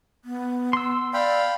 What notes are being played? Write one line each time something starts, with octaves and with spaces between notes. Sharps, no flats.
B3
C6 E6
D5 F5 G5 B5